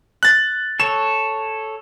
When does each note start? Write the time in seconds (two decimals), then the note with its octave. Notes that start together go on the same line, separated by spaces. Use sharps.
0.23 F#6 A6
0.80 A4 C#5 E7